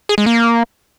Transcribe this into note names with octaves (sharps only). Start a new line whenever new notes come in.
G#4
G#3
A#3